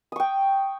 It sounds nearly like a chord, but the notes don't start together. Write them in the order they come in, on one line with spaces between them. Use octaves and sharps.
D#6 C#6 G5